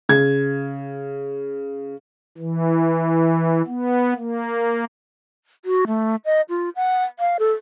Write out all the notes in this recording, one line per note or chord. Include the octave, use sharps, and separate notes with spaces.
C#3 G#6
E3
B3
A#3
F#4
A3
D#5
F4
F#5
F5
A4